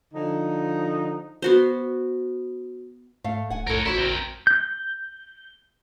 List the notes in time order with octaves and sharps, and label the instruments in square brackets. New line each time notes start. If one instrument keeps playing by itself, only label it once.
[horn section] D3 F3 D#4
[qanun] B3 F#4 C5
[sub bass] G#2 [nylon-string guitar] A3 F5
[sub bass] D1 [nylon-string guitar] F#5 G#5
[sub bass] B1 [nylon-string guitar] A2 A4 [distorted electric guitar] A#4 C#5
[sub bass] G#1 [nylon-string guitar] E2 F#4 C5 [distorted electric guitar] E4
[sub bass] A1 [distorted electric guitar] C4 A#4
[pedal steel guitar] G6